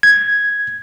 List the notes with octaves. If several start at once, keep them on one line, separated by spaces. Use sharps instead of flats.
G#6